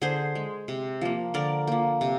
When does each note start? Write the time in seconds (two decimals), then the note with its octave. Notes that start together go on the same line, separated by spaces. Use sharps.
0.01 D3 G#4 C5
0.35 G#3
0.68 C3
1.01 F3 A#3
1.34 D3 A#4 D5
1.67 F3 A#3
2.01 C3